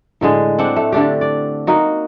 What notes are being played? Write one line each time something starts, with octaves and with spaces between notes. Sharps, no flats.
A2 D3 G#3
C4 D4 F#5
A3
D3 A3 D4 G4
D5
A#3 D#4 F#4